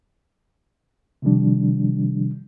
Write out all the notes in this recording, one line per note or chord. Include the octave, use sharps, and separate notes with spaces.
C3 D#3 F3 G3 D4